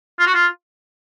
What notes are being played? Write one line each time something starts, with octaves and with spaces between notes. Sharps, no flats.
F4
F#4
F4